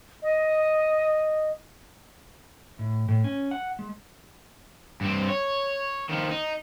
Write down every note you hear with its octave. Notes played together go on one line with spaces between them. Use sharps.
D#5
A2
A2
C#4
F#5
G#3
G2 C4
C#5
D#3 F3
D#4